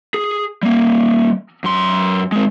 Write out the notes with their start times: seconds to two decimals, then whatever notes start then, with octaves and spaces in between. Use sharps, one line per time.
0.14 G#4
0.63 G3 A#3
1.64 F#2 C6
2.32 G#3 C4